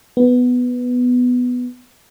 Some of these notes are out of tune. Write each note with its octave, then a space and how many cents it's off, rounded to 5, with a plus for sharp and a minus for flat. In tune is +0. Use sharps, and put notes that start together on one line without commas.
B3 +5